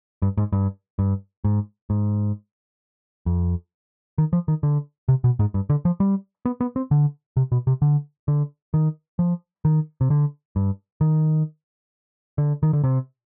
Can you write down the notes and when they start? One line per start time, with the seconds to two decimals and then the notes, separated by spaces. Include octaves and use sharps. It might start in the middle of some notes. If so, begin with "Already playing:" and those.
0.22 G2
0.37 G#2
0.53 G2
0.99 G2
1.44 G#2
1.90 G#2
3.26 F2
4.18 D#3
4.33 F3
4.48 D#3
4.63 D3
5.08 C3
5.24 B2
5.39 G#2
5.54 G2
5.70 D3
5.85 F3
6.00 G3
6.45 B3
6.61 B3
6.76 C4
6.91 D3
7.37 C3
7.52 B2
7.67 C3
7.82 D3
8.28 D3
8.74 D#3
9.19 F3
9.65 D#3
10.01 C3
10.10 D3
10.56 G2
11.01 D#3
12.38 D3
12.63 D#3
12.73 D3
12.84 C3